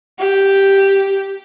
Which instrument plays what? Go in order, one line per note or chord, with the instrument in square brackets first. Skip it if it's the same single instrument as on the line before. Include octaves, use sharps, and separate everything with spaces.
[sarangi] G4